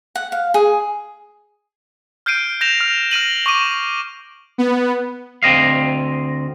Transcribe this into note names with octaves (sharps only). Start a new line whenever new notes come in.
F#5
F5
G#4
F6 G6 C7 D7 D#7
G6 A#6 E7 F7
F6 F7
F6 A#6 D#7 F#7
C#6 D6 D#7
B3
D2 C4 D#5 F5